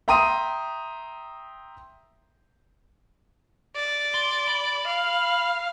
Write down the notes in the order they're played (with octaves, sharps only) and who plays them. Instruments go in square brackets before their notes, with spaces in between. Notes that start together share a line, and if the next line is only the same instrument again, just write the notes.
[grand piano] E5 G5 A#5 C6 D#6 D#7
[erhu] D5
[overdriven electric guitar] C6
B5
[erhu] F5